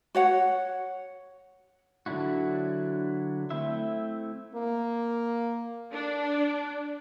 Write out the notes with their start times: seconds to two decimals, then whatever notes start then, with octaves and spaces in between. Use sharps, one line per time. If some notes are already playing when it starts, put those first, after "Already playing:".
0.15 F#4 C#5 F#5
2.06 D3 F#3 D4 E4 F#4
3.50 A3 C4 E4 E5
4.55 A#3
5.93 D4